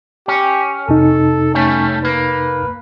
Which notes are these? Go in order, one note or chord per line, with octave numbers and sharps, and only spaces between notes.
C#4 G4
F2 C3 D#4 A4
G3 A3 C#4
A#3 B4